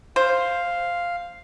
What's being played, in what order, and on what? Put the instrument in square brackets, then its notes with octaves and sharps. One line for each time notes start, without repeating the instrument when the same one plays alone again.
[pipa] C5 [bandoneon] F5